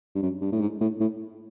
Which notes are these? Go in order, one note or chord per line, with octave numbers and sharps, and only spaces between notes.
G2
F#2
G2
A2
G#2
A2
A2